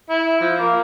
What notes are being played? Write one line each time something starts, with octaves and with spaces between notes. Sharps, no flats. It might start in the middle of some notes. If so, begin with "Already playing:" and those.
E4
F3
A#3